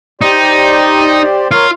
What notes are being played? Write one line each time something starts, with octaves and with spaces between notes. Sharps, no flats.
D#4 G4 C5 D5
F4 A#4 C#5